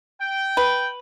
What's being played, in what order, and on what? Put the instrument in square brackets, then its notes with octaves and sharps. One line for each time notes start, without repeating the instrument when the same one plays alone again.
[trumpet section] G5
[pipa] B4